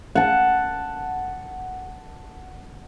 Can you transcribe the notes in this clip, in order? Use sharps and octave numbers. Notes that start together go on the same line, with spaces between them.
F#5 A5